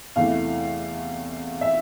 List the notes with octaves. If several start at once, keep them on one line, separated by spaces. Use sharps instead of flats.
E2 C3 E3 A3 F5
E5